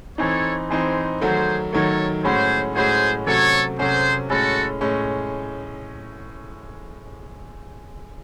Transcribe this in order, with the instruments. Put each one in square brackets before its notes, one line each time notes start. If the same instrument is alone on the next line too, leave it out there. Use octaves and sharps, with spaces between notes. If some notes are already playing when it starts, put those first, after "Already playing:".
[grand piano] E3 C4 D#4 [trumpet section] A4 C#5
[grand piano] E3 C4 D#4 [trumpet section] G#4 C5
[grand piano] D#3 F#3 A3 [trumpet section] G#4 C5
[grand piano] D#3 F#3 A3 [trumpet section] A4 C#5
[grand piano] A2 G#3 C#4 F#4 [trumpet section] G#4 C5
[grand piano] A2 G#3 C#4 F#4 [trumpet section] G#4 C5
[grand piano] C3 F#3 A3 C#4 F#4 [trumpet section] A4 C#5
[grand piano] C3 F#3 A3 C#4 F#4 [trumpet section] G#4 C5
[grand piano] A2 G#3 C#4 [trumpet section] F#4 A4
[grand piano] A2 G#3 C#4